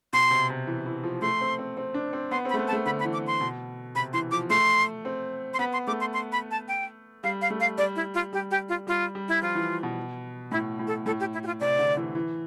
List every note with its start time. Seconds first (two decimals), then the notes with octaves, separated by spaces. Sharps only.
0.13 B2 C6
0.31 C3
0.49 C3
0.67 E3
0.86 E3
1.04 F3
1.21 A3 C6
1.41 C4
1.59 C4
1.77 C4
1.94 D4
2.13 C4
2.31 B3 C6
2.45 C4 B5
2.54 A3
2.59 B3
2.68 A5
2.72 A3
2.86 D3 B5
3.00 B5
3.05 E3
3.13 D6
3.27 C6
3.41 B2
3.95 C3 B5
4.13 E3 C6
4.31 F3 D6
4.50 A3 C6
5.05 C4
5.54 C6
5.59 B3 B5
5.73 C6
5.87 A3 D6
6.01 C6
6.14 C6
6.32 B5
6.51 A5
6.68 G5
7.24 G3 F5
7.42 F5
7.50 A3
7.60 F5
7.78 G3 D5
7.96 E4
8.14 F4
8.33 G3 G4
8.51 G4
8.69 F4
8.87 G3 F4
9.15 G3
9.28 E4
9.42 F3 F4
9.55 E3
9.83 B2
10.51 A2 E4
10.79 A2
10.87 A4
11.06 A2 A4
11.20 G4
11.33 E4
11.43 G4
11.47 F4
11.60 C3 D5
11.79 D3
11.97 E3
12.15 E3